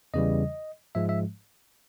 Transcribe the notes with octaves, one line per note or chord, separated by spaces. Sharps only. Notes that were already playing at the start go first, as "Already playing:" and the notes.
E2 C#3 E3 G3 D#5
G#2 F3 G#3 E5
E5